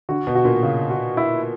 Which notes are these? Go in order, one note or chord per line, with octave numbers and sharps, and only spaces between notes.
D3 F#4
B2
F#4
A#2
C#3
F#4
E4